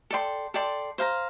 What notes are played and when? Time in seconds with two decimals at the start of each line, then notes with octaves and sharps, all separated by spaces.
0.11 A4 D5 G5 C6
0.54 A4 D5 G5 C6
0.98 C5 F5 A#5